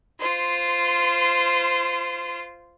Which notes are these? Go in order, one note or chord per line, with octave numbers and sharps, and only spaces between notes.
F4 C5